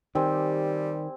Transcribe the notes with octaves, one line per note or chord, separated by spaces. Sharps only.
D#3 G3 C4 G4 G#5